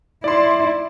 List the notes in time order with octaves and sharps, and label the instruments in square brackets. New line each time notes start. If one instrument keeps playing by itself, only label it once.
[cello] E4 [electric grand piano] D5 C6